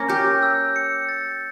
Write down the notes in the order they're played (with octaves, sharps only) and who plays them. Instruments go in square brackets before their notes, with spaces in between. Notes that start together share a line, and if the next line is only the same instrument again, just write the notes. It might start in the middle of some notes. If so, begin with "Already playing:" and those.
Already playing: [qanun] A#3 C#4 [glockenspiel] A#6
[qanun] G4 [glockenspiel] G6
[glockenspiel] E6
C#7
A6